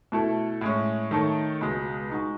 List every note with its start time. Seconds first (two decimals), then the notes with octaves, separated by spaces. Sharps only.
0.12 B2 A3 E4 A4
0.61 A2 G#3 C#4
1.11 D#3 A3 D#4 A4 C#5
1.61 C#2 B2 G#3
2.10 G#3 D#4 F#4